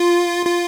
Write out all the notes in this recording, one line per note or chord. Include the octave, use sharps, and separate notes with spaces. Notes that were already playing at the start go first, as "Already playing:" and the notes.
Already playing: F4
F4